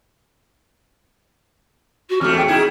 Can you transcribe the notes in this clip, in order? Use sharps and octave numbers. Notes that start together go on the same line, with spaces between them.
F#4
E2 G#2 A3 F6
G5
D#4 E4 G#4